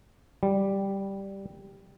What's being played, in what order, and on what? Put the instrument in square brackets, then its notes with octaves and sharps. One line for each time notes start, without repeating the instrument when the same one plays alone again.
[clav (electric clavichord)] G3